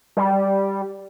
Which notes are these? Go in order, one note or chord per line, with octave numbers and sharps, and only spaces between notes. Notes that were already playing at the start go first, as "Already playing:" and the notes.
G3